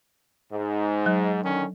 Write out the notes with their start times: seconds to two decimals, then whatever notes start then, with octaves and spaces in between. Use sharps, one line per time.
0.51 G#2
1.06 F#3
1.43 D3 D#3 C#4